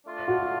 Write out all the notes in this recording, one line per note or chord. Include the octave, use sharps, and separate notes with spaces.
A3 D4 F4
F#4